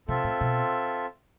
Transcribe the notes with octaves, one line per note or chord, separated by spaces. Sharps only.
C3 C4 F4 A4 E5
A2
B2